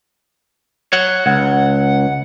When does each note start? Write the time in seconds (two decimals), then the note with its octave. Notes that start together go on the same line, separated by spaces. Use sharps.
0.93 C#5 F#5
1.26 C#2 F#5